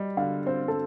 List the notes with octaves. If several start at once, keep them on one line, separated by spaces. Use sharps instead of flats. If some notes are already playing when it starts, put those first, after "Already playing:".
Already playing: G3 D#5
D3 F5
C4 C5
A4